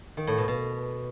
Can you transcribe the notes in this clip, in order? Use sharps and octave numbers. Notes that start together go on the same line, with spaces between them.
D#3
A2
B2
B2